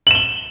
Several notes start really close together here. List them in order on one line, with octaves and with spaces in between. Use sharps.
F#7 E7 G7